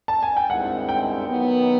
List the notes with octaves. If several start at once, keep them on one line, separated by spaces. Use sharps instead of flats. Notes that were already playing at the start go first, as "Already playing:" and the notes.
A5
G#5
G5
G2 D#3 G#3 C4 E4 F#5
G5
D#3 F#3 B3